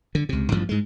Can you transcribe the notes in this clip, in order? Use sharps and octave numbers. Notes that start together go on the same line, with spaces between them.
D3
C#2 C3
A1 G2 F3
G#2 G#3